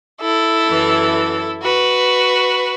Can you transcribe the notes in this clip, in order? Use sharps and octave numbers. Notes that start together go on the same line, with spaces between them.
E4 A4
F#2 E3
F#4 B4